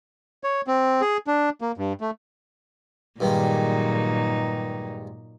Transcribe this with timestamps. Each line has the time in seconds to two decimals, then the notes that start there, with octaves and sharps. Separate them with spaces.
0.44 C#5
0.67 C4
1.01 G#4
1.27 D4
1.61 A#3
1.77 G2
2.01 A3
3.20 G2 A#2 D#3 F#3 G#3 D#4